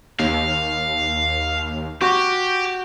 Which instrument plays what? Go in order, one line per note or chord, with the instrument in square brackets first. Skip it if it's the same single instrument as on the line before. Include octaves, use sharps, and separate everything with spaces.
[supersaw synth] D#2 [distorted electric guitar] F5
[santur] F#4 [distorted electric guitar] G4